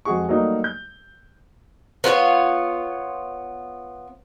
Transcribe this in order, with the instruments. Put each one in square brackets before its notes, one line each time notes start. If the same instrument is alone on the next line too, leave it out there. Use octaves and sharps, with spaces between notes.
[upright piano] F2 G#3 F#4 G#4 C#6
F#3 G3 A3 A#3 D#4
G6
[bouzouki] B3 F4 G4 C#5